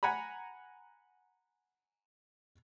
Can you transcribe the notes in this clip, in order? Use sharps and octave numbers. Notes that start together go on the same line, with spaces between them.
F#5 G#5 A#5 B5